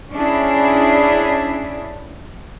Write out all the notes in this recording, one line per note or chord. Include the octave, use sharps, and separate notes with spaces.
C#4 D4 E4 G#4